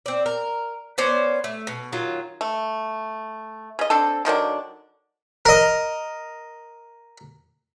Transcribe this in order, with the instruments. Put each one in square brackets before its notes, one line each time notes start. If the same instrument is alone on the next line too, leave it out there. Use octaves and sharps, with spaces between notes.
[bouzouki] C4 D5
A#4
B3 C#4 C5 D5
A3
B2
D#3 F#3 F4
[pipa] A3
C#3 D#5
C4 D4 A4
D3 D#3 F#3 D4
[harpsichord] A#4 D#5